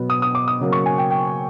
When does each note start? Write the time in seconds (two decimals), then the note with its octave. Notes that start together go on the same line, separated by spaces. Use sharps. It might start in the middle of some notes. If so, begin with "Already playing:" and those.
Already playing: B2 F#3 B3
0.10 D#6
0.22 D#6
0.35 D6
0.48 D#6
0.60 C#3 F#3 A#3
0.72 C#6
0.86 G#5
0.98 G5
1.10 G5